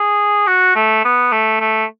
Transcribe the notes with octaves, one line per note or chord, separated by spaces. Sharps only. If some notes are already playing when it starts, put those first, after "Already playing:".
Already playing: G#4
F#4
A3
B3
A3
A3